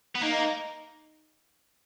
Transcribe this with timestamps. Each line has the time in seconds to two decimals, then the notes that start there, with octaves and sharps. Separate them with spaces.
0.15 B3
0.21 A#3 D#4